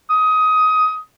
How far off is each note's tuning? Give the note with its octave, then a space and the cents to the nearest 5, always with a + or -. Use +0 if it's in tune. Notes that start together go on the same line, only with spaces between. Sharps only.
D#6 +20